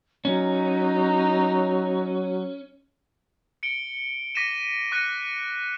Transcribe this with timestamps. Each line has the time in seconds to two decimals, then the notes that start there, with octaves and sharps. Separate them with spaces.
0.25 F#3 C#4 D#4
3.63 C#7 D7 G7
4.35 D6 A#6 B6 C#7 D#7 E7
4.92 D6 F#6 A#6 C#7 D#7